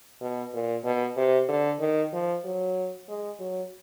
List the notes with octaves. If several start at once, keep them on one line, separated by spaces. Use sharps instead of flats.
B2
A#2
B2
C3
D3
D#3
F3
F#3
G#3
F#3